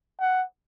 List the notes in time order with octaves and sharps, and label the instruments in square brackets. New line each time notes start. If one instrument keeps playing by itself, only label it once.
[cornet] F#5